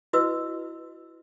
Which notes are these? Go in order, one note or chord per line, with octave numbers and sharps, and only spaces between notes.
E4 F#4 B4 D#5 E6